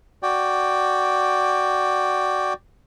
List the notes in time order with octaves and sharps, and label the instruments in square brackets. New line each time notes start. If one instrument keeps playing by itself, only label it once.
[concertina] F#4 D5 G5